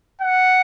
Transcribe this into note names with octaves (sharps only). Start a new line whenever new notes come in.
F#5